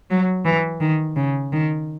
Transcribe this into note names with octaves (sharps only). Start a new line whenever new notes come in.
F#3
E3
D#3
C#3
D#3